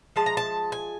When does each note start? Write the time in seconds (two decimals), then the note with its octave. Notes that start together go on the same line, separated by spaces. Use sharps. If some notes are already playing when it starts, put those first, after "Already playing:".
0.16 F3 G#3 A5
0.26 A#5
0.37 A5
0.72 G#5